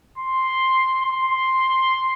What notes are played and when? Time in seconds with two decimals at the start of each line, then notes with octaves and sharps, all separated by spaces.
0.18 C6
1.06 C6